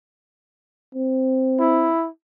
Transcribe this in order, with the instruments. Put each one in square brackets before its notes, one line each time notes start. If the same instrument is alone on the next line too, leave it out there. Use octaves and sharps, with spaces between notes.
[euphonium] C4
[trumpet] E4